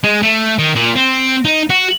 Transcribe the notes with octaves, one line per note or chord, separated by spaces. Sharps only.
G#3
A3
D#3
A#2
C4
D#4
F#4